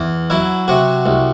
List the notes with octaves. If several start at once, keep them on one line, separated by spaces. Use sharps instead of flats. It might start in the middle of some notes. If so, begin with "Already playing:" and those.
Already playing: E2
F#3 E4
C3 F#4
C2